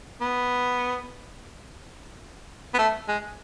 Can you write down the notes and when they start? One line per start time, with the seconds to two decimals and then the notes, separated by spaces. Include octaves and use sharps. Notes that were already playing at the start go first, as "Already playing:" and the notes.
0.21 B3
2.74 B3
2.79 A3
3.08 G#3